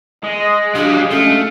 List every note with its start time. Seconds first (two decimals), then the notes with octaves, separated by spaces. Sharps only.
0.24 G#3 D#5
0.75 F#3 G3 D4 F5
1.11 A3 C#4